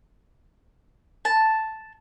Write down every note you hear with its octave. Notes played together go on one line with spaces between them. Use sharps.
A5